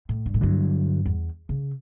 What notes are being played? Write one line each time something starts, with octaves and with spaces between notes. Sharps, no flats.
A2
G2
A2
G2 D3 F#3
E2
C#3